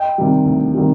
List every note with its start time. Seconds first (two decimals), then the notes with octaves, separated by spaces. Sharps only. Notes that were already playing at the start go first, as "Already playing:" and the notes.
Already playing: D#5 G5
0.18 C3 D#3 G3
0.46 D2
0.74 C3 D#3 G3